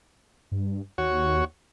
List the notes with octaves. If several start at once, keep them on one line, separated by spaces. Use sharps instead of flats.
G2
D#2 F#4 C#5